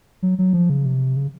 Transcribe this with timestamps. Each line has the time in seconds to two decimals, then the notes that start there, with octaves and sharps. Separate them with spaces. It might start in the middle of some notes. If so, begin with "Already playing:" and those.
0.23 F#3
0.39 F#3
0.53 F3
0.70 C#3
0.85 C3
1.16 C#3